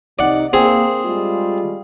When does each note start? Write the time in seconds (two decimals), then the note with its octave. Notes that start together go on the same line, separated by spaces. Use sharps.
0.19 C3 D#4 D5 F#5
0.53 A#3 C4 G#4
1.04 G3 G#3 F4